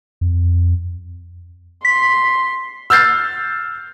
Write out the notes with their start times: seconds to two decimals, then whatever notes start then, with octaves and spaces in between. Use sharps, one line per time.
0.21 F2
1.85 C6 B6
2.90 E6 F6 G6 A6 C7